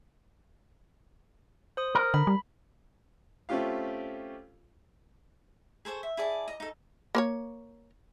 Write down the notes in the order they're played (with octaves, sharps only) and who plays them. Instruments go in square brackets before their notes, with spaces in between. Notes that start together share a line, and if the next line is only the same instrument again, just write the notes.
[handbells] C5 D#6
[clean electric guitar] A#4
[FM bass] D3 [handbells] B5
[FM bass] G3
[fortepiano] A3 C4 C#4 F4 G4 F5
[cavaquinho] G#4 A4 C5 C#6
E5
E4 G#4 D5 A5
D#5 A#5
D#4 A4
[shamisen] A#3 C5 C#5